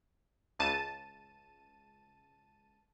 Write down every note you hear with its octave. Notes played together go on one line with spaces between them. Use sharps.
C#2 A5 D#7